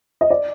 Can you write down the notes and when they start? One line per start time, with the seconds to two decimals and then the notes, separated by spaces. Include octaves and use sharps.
0.21 D#5
0.30 D5